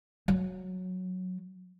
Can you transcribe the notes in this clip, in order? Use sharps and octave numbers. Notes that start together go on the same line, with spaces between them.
F#3